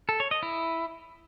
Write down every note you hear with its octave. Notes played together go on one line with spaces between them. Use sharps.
A4
C#5
D#5
E4